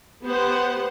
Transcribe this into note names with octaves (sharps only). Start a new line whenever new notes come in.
B3 G4 C5 F#5